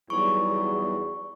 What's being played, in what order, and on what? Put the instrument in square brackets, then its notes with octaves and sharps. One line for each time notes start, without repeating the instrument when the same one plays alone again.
[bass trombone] E2 [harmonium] F#3 G3 [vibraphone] B3 D#4 G#4 [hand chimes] C#6